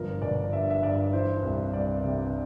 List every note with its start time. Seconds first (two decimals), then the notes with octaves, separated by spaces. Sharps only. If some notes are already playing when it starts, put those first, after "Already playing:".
Already playing: G1 F3 A#4
0.22 G1 D5
0.52 G2 E5
0.70 E5
0.82 G2 D5
1.13 E3 C5
1.43 C2
1.73 C2 D5
2.04 C3